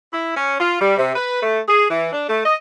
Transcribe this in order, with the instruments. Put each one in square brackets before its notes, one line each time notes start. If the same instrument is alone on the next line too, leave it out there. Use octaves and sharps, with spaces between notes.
[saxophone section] E4
C#4
F4
G3
C3
B4
A3
G#4
E3
D4
A3
D#5